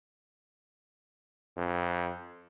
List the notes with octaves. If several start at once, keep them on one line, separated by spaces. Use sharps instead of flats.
F2